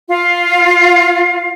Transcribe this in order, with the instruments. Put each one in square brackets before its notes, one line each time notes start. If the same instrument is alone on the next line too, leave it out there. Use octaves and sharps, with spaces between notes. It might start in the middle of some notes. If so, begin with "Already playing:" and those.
[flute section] F4 F5